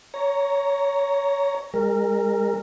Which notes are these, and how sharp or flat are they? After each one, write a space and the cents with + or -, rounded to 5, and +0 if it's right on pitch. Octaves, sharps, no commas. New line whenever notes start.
C#5 +15 A#5 +0
G#3 -40 A#4 -15